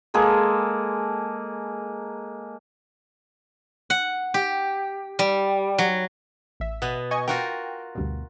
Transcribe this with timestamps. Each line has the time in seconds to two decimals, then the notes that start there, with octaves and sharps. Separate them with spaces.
0.14 G#3 A#3 G#4 A4
3.90 F#5
4.34 G4
5.19 G3
5.78 F#3
6.60 A1 E5
6.82 B2 B3
7.11 D#5 G#5 C#6
7.28 F4 F#4 A#4 G5
7.95 D2 G2 B2